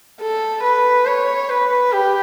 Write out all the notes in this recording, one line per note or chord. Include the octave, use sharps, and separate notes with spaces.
A4
B4
C#5
B4
G4